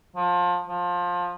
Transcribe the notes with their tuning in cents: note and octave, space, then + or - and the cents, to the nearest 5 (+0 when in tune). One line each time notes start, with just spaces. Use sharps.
F3 +25
F3 +20